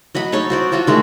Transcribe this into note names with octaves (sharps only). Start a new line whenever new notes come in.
F#3 D#5 F#5 B5
D#4 A4 C#5
F#4 C5 D5
F4 F#4 A4 C#5
D#3 G#3 A3